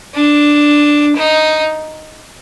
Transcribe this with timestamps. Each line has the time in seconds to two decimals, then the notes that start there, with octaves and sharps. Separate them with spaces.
0.15 D4
1.16 D#4